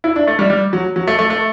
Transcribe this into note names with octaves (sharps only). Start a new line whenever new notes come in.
E4
D4
A3
G3
G3
F#3
F#3
A3
A3
A3